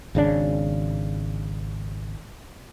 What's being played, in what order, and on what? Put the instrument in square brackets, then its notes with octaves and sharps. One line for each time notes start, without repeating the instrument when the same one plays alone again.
[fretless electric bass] G#1 C#3 D4